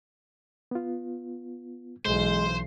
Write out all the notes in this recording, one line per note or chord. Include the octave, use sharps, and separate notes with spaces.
B3 F4
B1 E3 G#3 C5